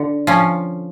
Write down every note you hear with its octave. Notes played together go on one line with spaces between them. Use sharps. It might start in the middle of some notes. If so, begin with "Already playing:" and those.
Already playing: D3
F3 C#4